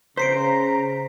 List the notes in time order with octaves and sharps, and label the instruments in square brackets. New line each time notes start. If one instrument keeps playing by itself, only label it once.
[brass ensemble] C#3 [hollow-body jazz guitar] C5 [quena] A#5 [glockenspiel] B6 C7 D7